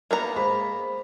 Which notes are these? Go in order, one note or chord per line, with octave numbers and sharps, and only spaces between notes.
A#3 B3 A#5
G#3 C5 B5